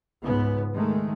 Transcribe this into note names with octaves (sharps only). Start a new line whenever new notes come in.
C#2 G#2 B3
D#3 G#3 A3